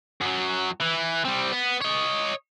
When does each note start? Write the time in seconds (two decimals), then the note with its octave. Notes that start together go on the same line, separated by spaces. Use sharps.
0.21 F#2 F#3
0.81 E3
1.25 G3 C4
1.52 B3
1.82 C#5 D#5